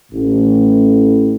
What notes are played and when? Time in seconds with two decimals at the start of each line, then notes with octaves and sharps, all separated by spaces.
0.12 A1 A2